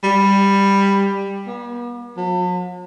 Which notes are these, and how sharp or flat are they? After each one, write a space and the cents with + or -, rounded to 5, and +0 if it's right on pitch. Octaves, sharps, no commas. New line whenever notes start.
G3 +10
B3 -45
F#3 -45